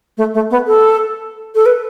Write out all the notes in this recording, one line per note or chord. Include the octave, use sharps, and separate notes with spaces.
A3
A3
B3
A4
A4
B4